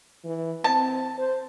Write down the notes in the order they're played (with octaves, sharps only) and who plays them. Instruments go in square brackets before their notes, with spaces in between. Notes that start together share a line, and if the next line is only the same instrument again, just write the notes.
[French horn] E3
[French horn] C4 [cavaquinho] A5
[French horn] C5